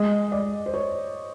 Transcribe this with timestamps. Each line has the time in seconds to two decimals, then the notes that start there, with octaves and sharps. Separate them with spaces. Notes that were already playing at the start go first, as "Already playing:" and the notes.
Already playing: G#3 D#5
0.32 D5
0.66 C5
0.74 C#5